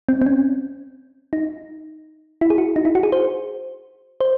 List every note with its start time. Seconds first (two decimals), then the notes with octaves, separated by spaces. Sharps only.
0.09 C4
0.22 C4
0.26 C#4
1.33 D#4
2.41 E4
2.50 G#4
2.58 F#4
2.76 D#4
2.85 E4
2.95 F#4
3.03 G#4
3.12 C5
4.21 C5